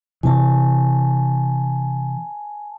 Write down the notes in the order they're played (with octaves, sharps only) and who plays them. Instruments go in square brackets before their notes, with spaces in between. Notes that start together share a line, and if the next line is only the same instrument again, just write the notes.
[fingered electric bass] C3 E3 [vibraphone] G#5 A5